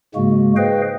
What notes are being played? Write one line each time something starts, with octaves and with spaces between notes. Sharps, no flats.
G#2 C#3 G#3 A#3 F#4
G#4 B4 C5 D#5 F5 G5